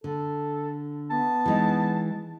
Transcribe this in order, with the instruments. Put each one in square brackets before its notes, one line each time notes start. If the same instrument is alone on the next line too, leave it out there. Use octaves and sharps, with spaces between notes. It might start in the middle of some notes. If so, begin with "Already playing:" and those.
[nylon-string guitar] D3 [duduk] A4
[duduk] B3 [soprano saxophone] A5
[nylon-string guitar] E3 G#3 D#4